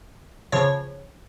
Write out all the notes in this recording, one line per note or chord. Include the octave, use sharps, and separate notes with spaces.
C#3 F3 C#5